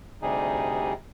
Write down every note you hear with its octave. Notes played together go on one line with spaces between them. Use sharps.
D2 C3 G3 D#4 G#4